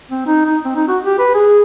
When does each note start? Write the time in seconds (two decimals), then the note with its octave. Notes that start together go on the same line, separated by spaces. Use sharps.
0.11 C4
0.26 D#4
0.46 D#4
0.65 C4
0.76 D#4
0.88 F#4
1.04 G4
1.19 B4
1.34 G#4